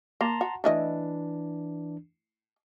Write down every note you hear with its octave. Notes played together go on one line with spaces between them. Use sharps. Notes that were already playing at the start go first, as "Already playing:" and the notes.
A#3 A5 A#5 C6
F#4
E3 A3 D4 E4 D#5